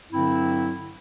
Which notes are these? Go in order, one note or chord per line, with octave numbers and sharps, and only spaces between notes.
G2 D3 F#3 C4 E4